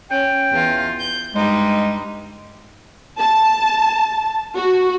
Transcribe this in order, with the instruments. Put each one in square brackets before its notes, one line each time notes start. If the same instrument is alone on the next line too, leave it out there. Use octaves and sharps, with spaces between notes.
[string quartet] C#4 [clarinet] G5
[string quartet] E2 F4
G6
[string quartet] G2 G3 D#4 [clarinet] G#3
[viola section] A5
F#4